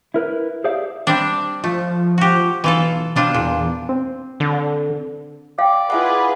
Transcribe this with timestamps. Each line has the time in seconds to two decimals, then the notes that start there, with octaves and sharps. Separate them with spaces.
0.14 E4 A#4 B4
0.64 G4 G#4 C5 D5 E5 F5
1.07 G3 C4 D4
1.64 F3 A3
2.18 F#4 G4
2.64 B1 E3 F4 A4
3.16 B2 G3 D4 F4
3.34 E2 A#2
3.89 C4
4.40 D3
5.59 D5 F5 G5
5.90 E4 F4 G#4 B4 E5 F#5